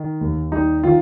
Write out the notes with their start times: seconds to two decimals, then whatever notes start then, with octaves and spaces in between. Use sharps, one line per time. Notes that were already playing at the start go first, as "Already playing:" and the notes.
Already playing: D#3
0.21 D#2
0.52 G3 D#4
0.83 D#3 F4